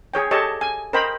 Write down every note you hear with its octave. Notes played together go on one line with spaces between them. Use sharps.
G#4 C#5 G5
G4 A4 C#5 D#5 A5
G#5
A#4 C5 D#5 G5 B5